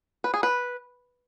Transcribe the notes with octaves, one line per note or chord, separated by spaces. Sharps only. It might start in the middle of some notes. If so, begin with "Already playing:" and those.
B4
G#4
B4